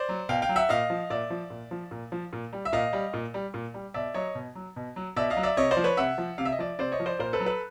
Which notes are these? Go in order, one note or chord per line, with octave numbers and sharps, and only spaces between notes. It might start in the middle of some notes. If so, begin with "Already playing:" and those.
Already playing: C5 D5
F#3
B2 F5 G5
F5 G5
F#3
E5 F#5
A#2 D#5 F5
F3
A#2 D5 E5
F3
A#2
F3
A#2
F3
A#2
G3
E5
A#2 D#5 F5
G3
A#2
G3
A#2
G3
B2 D5 E5
F#3 C#5 D#5
B2
F#3
B2
F#3
B2 D5 E5
D#5 F5
F#3
D5 E5
C3 C#5 D#5
C5 D5
F3
B4 C#5
C3 E5 F#5
F3
C3 F5
E5
D#5
F3 D5 E5
C3 C5 D5
C#5 D#5
F3
C5 D5
A#2 A#4 C5
A4 B4
F#3
A4 B4